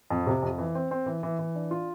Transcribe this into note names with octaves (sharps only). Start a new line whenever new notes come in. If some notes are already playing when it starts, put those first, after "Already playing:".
F2
C3
F2
E3
C4
C4
E3
E3
E3
D4
F4